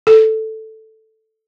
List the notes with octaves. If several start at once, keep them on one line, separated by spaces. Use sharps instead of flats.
A4